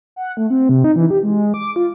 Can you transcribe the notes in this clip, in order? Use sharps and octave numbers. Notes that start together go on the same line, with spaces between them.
F#5
A3
C4
C3
D#4
E3
G4
G#3
D6
F4